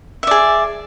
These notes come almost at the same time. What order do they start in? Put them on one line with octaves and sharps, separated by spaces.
E5 D5 G#4